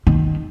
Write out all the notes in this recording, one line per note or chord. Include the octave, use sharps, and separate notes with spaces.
D#3